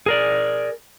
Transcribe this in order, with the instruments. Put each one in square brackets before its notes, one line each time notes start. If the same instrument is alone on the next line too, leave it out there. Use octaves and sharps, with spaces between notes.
[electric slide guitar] G#4 A#4 D5